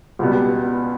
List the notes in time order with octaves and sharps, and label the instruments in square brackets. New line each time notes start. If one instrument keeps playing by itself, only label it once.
[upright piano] C#2 B2 G3 B3